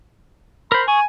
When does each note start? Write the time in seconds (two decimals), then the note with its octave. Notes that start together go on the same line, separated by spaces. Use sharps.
0.72 A#4 C5 B5
0.88 G#4 G#5 C#6